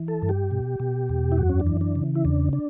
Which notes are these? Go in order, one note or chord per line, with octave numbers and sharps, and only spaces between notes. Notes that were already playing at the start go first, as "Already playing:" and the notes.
Already playing: E3
A4
G2
G4
B2
B2
E2
E4
F#2 F#4
C#4
D4
E3
D4
C#3
E4
E2 D4
D4